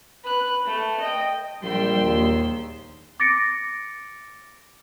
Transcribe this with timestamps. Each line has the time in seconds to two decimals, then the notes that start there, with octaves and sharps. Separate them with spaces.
0.24 B4 F#6
0.66 A3
1.00 D#5 G5
1.63 A#1 G3 G5 C6 E6
2.03 D#2
3.20 D6 A6 A#6 C#7 D7